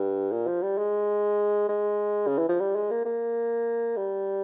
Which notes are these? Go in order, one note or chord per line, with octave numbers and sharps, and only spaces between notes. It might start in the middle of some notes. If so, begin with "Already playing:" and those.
Already playing: G2
A#2
F3
G3
G#3
G#3
C#3
E3
F3
G3
G#3
A#3
A#3
G3